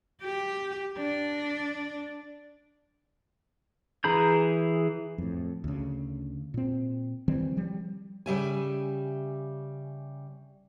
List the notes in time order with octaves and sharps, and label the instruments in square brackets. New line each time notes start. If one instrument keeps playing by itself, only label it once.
[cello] G4
D4
[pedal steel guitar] E3 G#4 A#5 B5 G6
[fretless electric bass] F2 A2
D2 C#3
A#2 C4
D#3 E3 G3 C4
F3 G3
[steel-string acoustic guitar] C#3 G3 E5 G#5